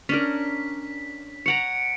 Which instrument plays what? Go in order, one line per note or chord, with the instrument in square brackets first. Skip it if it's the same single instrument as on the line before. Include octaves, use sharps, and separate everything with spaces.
[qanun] C#4 D4 A#4 [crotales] B6
[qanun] C#5 F#5 A#5 [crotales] C#7 D7